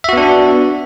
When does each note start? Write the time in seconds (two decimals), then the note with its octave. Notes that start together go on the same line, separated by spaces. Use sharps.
0.04 E5
0.09 F#4
0.13 B3
0.17 D4